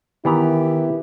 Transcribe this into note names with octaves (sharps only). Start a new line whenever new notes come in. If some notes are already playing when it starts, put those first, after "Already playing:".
D#3 E3 B3 E4 G4 A#4 A#5